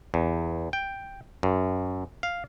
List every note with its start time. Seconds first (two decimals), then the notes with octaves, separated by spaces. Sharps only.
0.14 E2
0.73 G5
1.43 F#2
2.23 F5